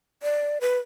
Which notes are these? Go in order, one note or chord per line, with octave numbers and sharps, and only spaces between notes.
D5
B4